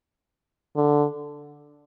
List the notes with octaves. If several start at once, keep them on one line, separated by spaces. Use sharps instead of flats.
D3